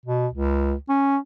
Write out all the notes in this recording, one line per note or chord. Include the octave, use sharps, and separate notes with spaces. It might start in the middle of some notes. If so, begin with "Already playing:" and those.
B2
C#2
C#4